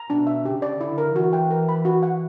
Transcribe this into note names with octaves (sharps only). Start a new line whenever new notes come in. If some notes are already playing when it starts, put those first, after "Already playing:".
Already playing: A#5
B2 D4
E5
C#3 G4
D5
D3 E4
A#4
E3 F#4
G5
A#4
B5
F#4
F#5